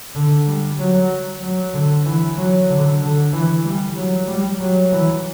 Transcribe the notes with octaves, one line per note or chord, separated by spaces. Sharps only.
D3
G3
F#3
F#3
D3
E3
F#3
D3
D3
E3
G3
F#3
G3
F#3
E3